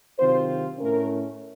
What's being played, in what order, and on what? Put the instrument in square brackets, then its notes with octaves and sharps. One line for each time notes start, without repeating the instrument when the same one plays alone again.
[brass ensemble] C3 D#3 F#3 C4 F4 C5
A2 A3 C#4 A#4